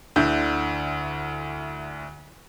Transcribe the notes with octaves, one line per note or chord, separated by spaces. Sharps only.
D2 D3 E4 G6